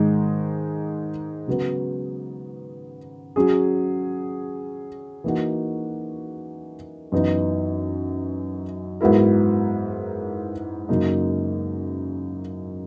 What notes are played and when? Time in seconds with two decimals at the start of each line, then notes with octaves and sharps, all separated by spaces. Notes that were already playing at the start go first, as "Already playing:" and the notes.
Already playing: G#2 D#3 G#3 D#4
1.48 C#3 F#3 B3
3.36 F#3 C#4 G#4
5.24 E3 A#3 D#4 F#4
7.12 F#2 E3 B3 D#4
9.01 G#2 F#3 B3 E4 A#4
10.89 F#2 C#3 F#3 A#3 D#4